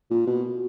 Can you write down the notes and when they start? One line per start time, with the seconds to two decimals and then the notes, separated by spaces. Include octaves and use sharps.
0.11 A#2
0.27 B2